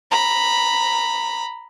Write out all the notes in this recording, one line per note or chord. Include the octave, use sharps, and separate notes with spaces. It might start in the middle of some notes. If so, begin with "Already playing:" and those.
A#5 B5